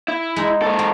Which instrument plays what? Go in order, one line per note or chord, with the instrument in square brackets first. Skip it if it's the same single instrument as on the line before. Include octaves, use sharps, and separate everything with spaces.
[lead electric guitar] E4
[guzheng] G#3 D#4
[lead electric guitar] G#2 A4
[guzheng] A#3